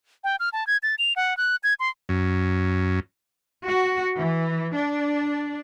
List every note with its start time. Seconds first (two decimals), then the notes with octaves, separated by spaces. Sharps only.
0.24 G5
0.40 F6
0.53 A5
0.67 G#6
0.83 A6
0.99 F7
1.16 F#5
1.37 F#6
1.63 G#6
1.80 C6
2.09 F#2
3.66 F#4
4.17 E3
4.76 D4